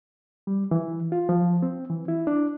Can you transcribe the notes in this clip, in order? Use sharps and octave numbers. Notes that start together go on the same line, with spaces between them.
G3
E3
F4
F3
C4
E3
E4
D4